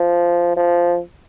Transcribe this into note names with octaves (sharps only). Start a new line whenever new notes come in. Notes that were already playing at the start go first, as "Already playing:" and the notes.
Already playing: F3
F3